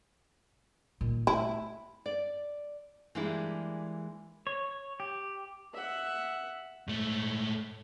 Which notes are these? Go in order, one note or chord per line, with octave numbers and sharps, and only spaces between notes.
A#2 D#3
A3 E4
D5
E3 G3 G#3 A#3 D4 E4
C#5
G4
E5 F#5
G#2 A3